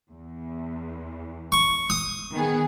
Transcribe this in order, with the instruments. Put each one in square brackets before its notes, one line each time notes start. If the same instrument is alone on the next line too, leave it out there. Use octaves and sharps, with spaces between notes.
[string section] E2
[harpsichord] C#6
D#6
[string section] D#3 B3 G#4